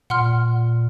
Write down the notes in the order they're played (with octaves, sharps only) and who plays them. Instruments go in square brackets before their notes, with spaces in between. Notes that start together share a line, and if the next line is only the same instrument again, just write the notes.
[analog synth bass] A#2 [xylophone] F#5 C6 F6